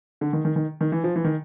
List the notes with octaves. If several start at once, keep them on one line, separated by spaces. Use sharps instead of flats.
D3
D#3
D#3
D#3
D#3
E3
F3
E3
D#3